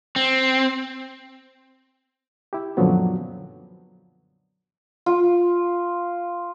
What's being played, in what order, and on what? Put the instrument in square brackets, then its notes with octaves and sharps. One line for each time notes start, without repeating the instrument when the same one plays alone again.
[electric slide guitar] C4
[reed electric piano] E4 G4
F#2 A#2 D3 F3 F#3 B3
[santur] F4